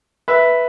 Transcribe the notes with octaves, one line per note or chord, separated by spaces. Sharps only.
B4 E5